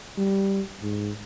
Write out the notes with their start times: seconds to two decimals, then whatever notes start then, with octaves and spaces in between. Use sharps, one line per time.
0.18 G3
0.83 G#2